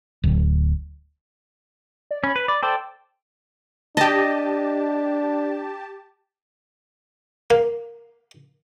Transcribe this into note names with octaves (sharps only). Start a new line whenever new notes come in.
D1
D5
C#4 B5
B4
D5
A4 C5 D5 G5
D4 G4 D#5 A5
A#3